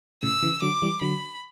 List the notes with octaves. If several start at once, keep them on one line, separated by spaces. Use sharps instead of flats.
A2 C#3 E6
C#3 E3
D3 F#3 D6
E3 G3
D3 F#3 B5